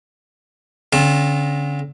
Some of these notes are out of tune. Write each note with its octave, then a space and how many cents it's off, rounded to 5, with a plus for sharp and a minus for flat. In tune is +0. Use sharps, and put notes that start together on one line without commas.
D3 -35 C4 +35 A5 -20